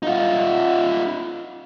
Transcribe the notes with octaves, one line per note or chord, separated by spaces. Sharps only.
D#4 F4